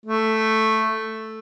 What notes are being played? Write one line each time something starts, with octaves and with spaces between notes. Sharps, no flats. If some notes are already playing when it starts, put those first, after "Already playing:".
A3